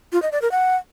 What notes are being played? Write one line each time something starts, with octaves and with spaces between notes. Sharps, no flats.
F4
D#5
D5
A#4
F#5